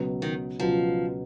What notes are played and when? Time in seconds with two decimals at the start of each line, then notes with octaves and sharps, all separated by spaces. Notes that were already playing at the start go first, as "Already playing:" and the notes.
Already playing: C#2 B2 F#3 B3
0.22 D#3
0.60 C#2 B2 F3 F#3 B3